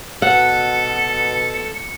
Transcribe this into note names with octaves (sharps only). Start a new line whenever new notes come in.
B2 A4 F#5 C#7